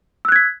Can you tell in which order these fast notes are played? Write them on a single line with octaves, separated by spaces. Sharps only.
E6 F#6 G#6 B6